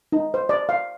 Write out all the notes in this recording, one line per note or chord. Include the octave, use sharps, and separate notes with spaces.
D#4
C5
D5
F5